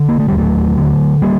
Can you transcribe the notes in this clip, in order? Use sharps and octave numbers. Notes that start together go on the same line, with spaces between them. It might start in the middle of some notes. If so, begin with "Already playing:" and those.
Already playing: D3
A#3
A3
D#2 G3
F#3 A3
D3
G3 A#3